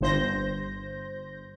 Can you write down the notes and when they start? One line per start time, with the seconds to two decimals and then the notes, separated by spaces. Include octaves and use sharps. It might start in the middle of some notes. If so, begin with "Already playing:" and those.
0.01 G1 G2 C5 G6 A#6